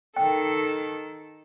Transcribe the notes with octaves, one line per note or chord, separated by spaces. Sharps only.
D#3 A4 G5